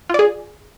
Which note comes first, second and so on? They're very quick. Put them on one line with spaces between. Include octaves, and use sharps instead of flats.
F4 D5 G#4